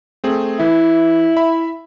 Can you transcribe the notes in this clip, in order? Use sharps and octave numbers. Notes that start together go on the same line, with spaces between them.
A3 C4 G#4
E3 E4
E5 B5